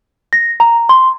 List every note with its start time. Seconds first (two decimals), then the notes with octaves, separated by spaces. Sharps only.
0.33 A#6
0.60 A#5
0.89 C6